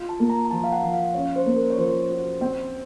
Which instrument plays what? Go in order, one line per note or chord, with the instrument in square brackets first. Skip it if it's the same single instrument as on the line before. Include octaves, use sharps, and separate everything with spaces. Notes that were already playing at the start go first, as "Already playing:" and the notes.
Already playing: [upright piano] F4
[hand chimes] A5
[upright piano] A#3
[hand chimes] A#5
A#5
[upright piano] F3 [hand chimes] A5
[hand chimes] F5
F#5
[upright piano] F3
[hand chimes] F5
[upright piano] C#4 [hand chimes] C#5
[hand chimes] C5
[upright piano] A#3
[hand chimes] A#4
C#5
[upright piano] F3 [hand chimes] C5
[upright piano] F#4
C4